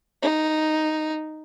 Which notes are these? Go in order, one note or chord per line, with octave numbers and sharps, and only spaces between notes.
D#4